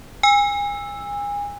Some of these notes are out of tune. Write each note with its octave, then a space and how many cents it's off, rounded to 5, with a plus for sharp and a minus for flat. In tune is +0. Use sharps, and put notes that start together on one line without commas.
G#5 -30 E6 +0